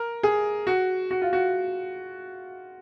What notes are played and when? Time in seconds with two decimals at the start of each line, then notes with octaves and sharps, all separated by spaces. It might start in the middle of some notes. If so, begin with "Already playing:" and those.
Already playing: A#4
0.23 G#4
0.67 F#4
1.11 F#4
1.22 F4
1.33 F#4